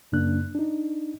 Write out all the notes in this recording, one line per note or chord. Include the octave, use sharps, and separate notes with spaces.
F#2 C#3 A#3 D4 F#6
D4 D#4